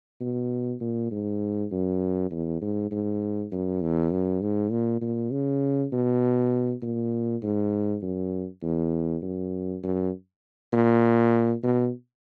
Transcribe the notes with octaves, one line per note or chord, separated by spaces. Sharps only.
B2
A#2
G#2
F#2
E2
G#2
G#2
F#2
E2
F#2
G#2
A#2
A#2
C#3
B2
A#2
G#2
F#2
E2
F#2
F#2
A#2
B2